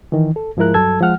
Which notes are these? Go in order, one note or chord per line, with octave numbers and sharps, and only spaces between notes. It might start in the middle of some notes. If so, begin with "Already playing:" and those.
D#3 E3
A4
G#2 F3 G#3 E4 A#4 F#6
G2 F#3 A4 A5 E6 G#6
F3 G#3 F#5 F6